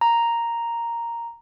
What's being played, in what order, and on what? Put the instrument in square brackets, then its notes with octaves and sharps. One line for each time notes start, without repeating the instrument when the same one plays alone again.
[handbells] A#5